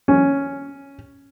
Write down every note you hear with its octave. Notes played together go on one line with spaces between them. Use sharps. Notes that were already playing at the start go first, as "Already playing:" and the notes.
C#4